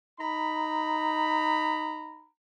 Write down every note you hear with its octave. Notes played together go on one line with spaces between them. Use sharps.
D#4 A#5 B5